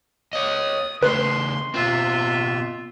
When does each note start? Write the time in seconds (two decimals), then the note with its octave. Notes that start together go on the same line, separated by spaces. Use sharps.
0.33 C#5 D#5 D#6
1.03 C#3 A3 B4 C6
1.74 B2 C4 F4 E5